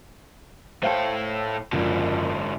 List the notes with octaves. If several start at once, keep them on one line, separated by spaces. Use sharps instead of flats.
A2 A4 C5 F5 G5
F#1 G#2 D3 F3 D5